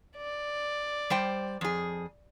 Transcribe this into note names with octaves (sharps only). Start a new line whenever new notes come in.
D5
G3 C5 G5
F2 G#4